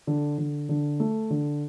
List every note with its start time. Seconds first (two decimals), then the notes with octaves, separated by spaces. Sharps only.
0.07 D3
0.38 D3
0.69 D3
1.00 A3
1.30 D3